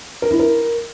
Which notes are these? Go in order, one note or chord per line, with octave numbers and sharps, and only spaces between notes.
A#4
E4
A#4